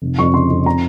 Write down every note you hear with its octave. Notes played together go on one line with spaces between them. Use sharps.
F1
F2 C#6
C#3 C6
F2
C4 A#5